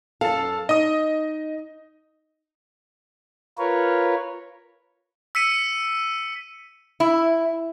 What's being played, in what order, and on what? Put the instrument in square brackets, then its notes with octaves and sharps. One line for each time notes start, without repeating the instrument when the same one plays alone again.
[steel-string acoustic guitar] F#2 A4 [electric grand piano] F5 A5
[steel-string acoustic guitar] D#4 [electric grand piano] D#5 D#6
[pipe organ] F4 A#4 B4 C#5
[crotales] E6 B6 C#7 D#7
[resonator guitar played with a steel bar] E4